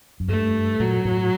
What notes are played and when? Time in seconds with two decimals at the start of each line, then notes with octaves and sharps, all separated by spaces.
0.20 F#2
0.28 G2 A3
0.80 A#2 F#3
1.05 A2